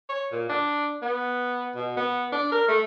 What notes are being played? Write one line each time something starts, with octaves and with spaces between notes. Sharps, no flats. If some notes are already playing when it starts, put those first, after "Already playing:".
C#5
A#2
D4
B3
B2
B3
D4
A#4
A3